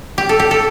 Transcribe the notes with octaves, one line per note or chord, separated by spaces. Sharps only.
G4
A4
G4
A4